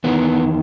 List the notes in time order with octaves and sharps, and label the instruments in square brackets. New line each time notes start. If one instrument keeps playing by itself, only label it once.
[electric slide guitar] E2 D#3 B3